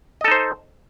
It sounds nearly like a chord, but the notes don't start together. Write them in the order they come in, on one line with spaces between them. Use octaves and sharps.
D#5 A4 D#4 C5